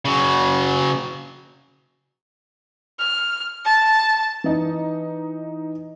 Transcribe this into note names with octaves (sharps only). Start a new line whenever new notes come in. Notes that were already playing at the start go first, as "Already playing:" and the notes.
C#3 F#3
F6
A5
E3 D#4